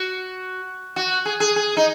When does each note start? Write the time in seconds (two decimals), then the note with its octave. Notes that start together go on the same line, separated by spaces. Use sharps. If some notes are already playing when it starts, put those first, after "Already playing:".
Already playing: F#4
0.96 F#4
1.25 G#4
1.40 G#4
1.56 G#4
1.77 D#4